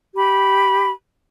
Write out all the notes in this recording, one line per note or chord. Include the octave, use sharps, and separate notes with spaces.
G4 B5